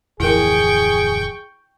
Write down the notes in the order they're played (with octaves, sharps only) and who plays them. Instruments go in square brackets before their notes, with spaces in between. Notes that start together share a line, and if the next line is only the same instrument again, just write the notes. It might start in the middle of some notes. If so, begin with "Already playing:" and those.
[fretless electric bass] D1 F2 E3 [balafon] E4 A#4 [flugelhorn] G#4 [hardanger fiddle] G5 C#6